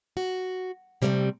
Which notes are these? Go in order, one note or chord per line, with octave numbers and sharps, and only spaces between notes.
F#4
C3 G3 A3 A#3 C4